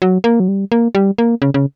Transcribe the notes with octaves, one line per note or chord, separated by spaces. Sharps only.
F#3
A#3
F#3
G3
A#3
G3
A#3
C#3
C#3